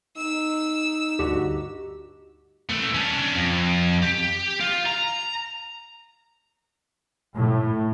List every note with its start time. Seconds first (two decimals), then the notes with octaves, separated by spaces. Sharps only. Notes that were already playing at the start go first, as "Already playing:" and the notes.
0.17 D#4 E6
1.19 D2 G2 F#4 G4
2.69 E3 A3
2.94 C#4 D4
3.34 F2
4.03 G4
4.60 F4
4.86 A#5
7.35 A2